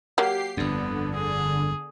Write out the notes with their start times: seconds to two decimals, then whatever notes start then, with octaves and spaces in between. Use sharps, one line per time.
0.18 F#3 A#3 G4 C7
0.57 G1 F2 D3 B3
1.14 G#4